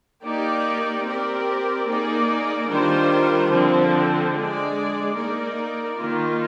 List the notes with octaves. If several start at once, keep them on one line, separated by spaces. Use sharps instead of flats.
A#3 D#4 G4 D5
C4 G4 A#4 D5
A#3 D#4 G#4 D5
D#3 G3 D4 F4 C5
D3 F3 C4
G#3 D4 G#4 D5
A#3 D#4 A#4 D5
D#3 A#3 F4